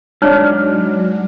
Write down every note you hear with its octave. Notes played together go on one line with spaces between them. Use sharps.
G#2 F#3 D4 D#4 C#5 A#5 F6